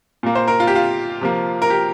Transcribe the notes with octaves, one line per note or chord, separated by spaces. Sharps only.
A#2 A#3
C5
A#4
F4
G4
F4
C3 F3 A#3
A#4
G4